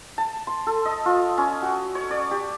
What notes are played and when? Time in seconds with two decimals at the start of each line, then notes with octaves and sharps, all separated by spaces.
0.18 A5
0.47 C6
0.67 A4
0.85 D#5
1.06 F4
1.38 C#4
1.62 F#4
1.95 C#5
2.11 D5
2.31 G4